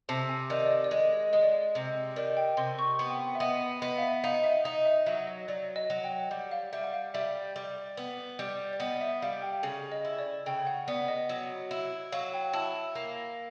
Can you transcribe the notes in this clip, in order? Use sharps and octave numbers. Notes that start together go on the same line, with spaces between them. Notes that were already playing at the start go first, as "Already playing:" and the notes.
C3 A5
G#5
D#3 D5
D5
D#5
D5
G#3 D#5
D#5
G#3 D#5
D5
D#5
C3
D#3 D5
G5
C3 C6
C#6
B3 C6
G5
F#5
E5
B3 D#5
B3 D#5
F5
E5
D#4 F5
E5
D#4 D#5
E5
F#3 E5
D#5
F#3 D5
D#5
F#3
G5
G3 F#5
F5
G3 E5
F#5
F5
G3 E5
G3
B3
G3
D5
B3 D#5
E5
G3 F5
G5
C#3 G#5
D#5
E4
D5
C#3 G5
F#5
B3 D5
D#5
F#3
E4
F#3 F5
G5
E4 A5
A#3